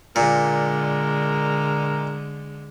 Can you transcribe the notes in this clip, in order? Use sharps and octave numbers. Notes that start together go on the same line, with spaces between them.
A#2 D3 G#3 A#4